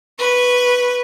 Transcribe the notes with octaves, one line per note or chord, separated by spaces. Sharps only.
B4 C#6